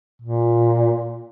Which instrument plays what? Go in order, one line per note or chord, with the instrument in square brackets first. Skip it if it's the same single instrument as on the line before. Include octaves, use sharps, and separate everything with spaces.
[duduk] A#2